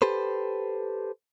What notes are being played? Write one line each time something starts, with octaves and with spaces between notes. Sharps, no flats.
G4 A4 B4 C5